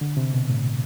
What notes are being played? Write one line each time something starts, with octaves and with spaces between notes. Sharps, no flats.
D3
C3
B2
A2